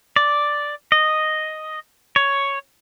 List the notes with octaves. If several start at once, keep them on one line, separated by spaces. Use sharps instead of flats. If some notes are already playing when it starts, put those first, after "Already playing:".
D5
D#5
C#5